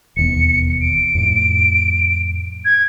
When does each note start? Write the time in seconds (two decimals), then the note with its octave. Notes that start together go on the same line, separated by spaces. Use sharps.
0.17 E1 D#2 B3 C#7
0.81 D7
1.15 F2 A2
2.65 G#6